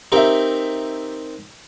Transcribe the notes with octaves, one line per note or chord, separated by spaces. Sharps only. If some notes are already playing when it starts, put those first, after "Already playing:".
C4 D#4 G4 A#4 E5